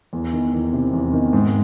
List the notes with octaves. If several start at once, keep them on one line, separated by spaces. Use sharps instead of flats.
E2
D#3
E2
C3
E2
D#3
G#2